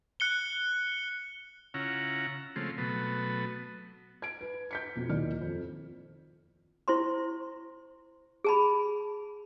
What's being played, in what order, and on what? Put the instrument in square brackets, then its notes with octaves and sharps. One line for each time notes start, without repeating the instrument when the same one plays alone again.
[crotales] F#6 C#7 G7
[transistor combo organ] C#3 C#4 E4 F4 F#5 A#5
C#3 F3 G#3 A3 C4
B2 F#3 A3 B3
[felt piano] G#6 D7
B4
G6 B6 C#7
F2 B2
D#1 D#2 E4 D5 D#5 F6
F2
[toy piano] E4 C5 C6
G#4 A5 B5